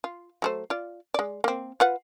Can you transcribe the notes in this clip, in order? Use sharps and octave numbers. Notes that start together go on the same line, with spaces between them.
F4
F#3 A3 C5
F4 D5
G#3 D5
A#3 C4
F4 B4 F#5